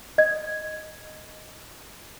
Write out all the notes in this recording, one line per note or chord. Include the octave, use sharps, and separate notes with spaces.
D#5 G#6